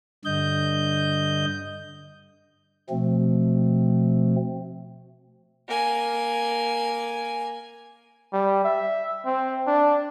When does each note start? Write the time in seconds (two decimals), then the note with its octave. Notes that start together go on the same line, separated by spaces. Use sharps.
0.25 G2 D3 D#5 G6
2.90 B2 F3 A3 C4
5.69 A#3 G#5
8.33 G3
8.64 E5
9.26 C4
9.67 D4